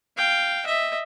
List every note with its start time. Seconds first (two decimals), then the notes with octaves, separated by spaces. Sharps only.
0.17 F5 G5
0.66 D#5 E5